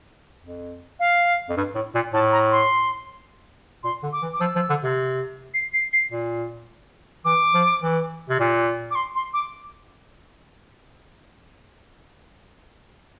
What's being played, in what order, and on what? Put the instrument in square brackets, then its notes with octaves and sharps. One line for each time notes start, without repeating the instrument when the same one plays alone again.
[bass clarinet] F2
[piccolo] F5
[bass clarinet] F2
G2
A2
A#2
[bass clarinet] A2 [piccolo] A5
[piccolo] A#5
C6
[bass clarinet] A#2 [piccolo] C6
[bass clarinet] D3
[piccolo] D6
[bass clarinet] E3
[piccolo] D6
[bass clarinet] F3 [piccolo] E6
[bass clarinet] F3
D3
C3
[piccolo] C7
C7
C7
[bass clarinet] A#2
[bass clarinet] E3 [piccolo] D6
[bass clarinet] F3
E3
C3
A#2
[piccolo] D6
C6
C6
D6